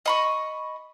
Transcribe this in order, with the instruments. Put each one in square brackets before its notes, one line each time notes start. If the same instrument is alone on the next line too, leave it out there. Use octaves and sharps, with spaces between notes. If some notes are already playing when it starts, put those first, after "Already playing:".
[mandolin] D#5 B5 C#6